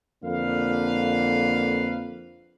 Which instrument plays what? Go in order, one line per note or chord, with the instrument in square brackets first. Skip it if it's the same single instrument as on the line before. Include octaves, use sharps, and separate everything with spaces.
[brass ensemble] F2 D3 A#3 B4 F5